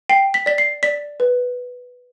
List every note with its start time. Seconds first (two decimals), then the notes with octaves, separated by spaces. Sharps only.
0.10 G5 C7
0.34 B6
0.46 D5 B6
0.58 C7
0.83 D5 B6
1.20 B4